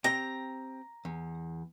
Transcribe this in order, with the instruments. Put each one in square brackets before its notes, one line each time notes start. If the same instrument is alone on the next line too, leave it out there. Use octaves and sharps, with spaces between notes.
[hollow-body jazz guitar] C4 G4 G5 [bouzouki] A#5
[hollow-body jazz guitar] E2